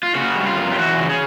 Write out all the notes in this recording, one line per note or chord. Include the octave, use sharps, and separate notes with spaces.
F4
C#3 F#4
G3
F4
F#2
G4
E3 F#4
C#3
G#4